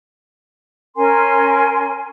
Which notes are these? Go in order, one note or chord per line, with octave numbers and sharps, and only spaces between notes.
C#4 A#4 G#5 C6